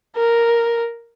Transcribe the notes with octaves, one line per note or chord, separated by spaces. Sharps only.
A#4